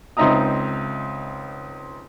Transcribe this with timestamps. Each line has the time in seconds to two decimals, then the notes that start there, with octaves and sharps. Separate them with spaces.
0.17 C#2 C4 D#4 E5 A#5 D#6